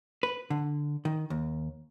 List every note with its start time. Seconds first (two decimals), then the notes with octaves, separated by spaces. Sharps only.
0.23 B4
0.50 D3
1.05 D#3
1.30 D#2